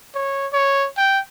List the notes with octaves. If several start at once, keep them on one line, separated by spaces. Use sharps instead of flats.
C#5
C#5
G5